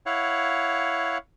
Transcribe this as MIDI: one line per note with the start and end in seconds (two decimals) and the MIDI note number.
0.06 1.18 64
0.06 1.18 73
0.06 1.18 77
0.06 1.18 78